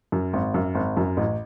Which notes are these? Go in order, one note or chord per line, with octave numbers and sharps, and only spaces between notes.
F#2
G#1
F#2
G#1
F#2
A1